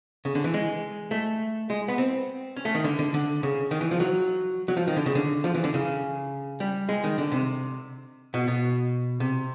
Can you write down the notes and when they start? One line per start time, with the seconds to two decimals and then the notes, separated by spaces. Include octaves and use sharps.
0.25 C#3
0.35 D3
0.44 E3
0.54 G#3
1.11 A3
1.70 G#3
1.88 B3
1.98 C4
2.57 C#4
2.65 A3
2.75 D#3
2.84 D3
2.99 D3
3.14 D3
3.43 C#3
3.71 D#3
3.81 E3
3.91 F3
4.00 F#3
4.68 F#3
4.77 F3
4.87 D#3
4.96 D3
5.06 C#3
5.15 D3
5.44 F3
5.55 E3
5.64 D3
5.74 C#3
6.60 G3
6.89 G#3
7.04 D#3
7.18 D3
7.32 C3
8.34 B2
8.48 B2
9.20 C3